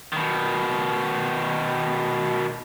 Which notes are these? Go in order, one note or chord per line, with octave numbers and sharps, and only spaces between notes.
B2 D#3